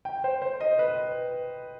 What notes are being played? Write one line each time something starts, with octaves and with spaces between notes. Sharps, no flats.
G5
C5
C5
D#5
B4